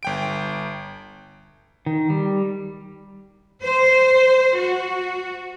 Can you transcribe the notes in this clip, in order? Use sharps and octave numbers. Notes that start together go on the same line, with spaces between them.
G1 G5 D7
D#3
G3
C5
F#4